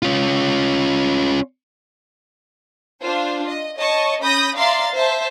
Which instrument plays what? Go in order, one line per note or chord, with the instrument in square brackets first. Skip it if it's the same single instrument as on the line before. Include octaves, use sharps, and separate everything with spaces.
[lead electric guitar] C#4 F4
[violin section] D4 F4 C5
D#5
C#5 D#5 A5 C#6
C#4 B5 D#6 G6 A#6
D5 E5 F5 A#5 C6 A6
C5 E5 A5